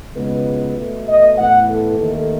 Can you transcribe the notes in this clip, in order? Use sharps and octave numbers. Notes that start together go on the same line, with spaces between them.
C#2 B2 G#3 B3 B4
B2 A3
D#5
A2 E3 B3 F#5
A4
D#2 D#3 A3